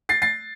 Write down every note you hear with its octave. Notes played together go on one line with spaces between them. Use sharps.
A6 C7
A6 C7